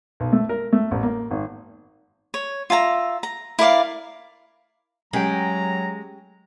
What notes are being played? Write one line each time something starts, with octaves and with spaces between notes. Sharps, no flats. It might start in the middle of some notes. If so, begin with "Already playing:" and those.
B1
A3
A#4
A3
A1
A#3
G#1
C#5
F4 E5 A5 A#5
A#5
E4 A#4 D5 F5
F#3 G#3 C#4 G4 G5 A#5